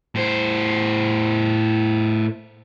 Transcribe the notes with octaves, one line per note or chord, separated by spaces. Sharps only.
A2 C5